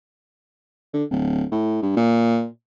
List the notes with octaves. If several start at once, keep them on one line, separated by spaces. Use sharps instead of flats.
D3
D1
A2
G2
A#2